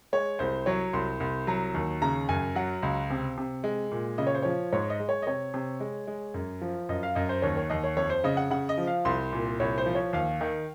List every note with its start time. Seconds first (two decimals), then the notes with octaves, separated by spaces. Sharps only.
0.13 G#3 C#5
0.39 C2 C5
0.66 F#3 C#5
0.93 C2 C6
1.20 C2
1.47 F#3 A#5
1.74 D#2
2.02 C#3 A#5
2.29 F#2 G#5
2.55 F#3 F#5
2.82 C#2
3.10 C3
3.38 C3
3.64 G#3
3.92 A#2
4.18 C#3 D#5
4.27 C#5
4.35 C5
4.43 F3 C#5
4.73 G#2 C#5
4.90 D#5
5.00 G#3
5.09 C#5
5.22 D#5
5.27 C3 C#5
5.54 C3
5.80 G#3
6.07 G#3
6.34 F#2
6.61 F3
6.89 F#2 D#5
7.03 F5
7.15 F#2 D#5
7.29 C5
7.42 D#2 C#5
7.57 C#5
7.70 D#2 D#5
7.84 C#5
7.96 F2 C#5
8.10 C5
8.24 C#3 D#5
8.37 F#5
8.51 C#3 F#5
8.69 D#5
8.78 F3
8.87 F5
9.05 C2 C6
9.33 A#2
9.60 C2 C#5
9.78 C5
9.86 F3
9.95 C#5
10.13 D#2 F5
10.41 D#3